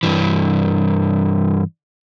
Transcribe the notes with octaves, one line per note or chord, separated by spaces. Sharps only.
G2 E3